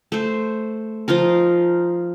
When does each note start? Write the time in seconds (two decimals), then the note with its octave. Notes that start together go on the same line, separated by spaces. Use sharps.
0.12 A3 C5
1.08 F3 D#4 F4 A#4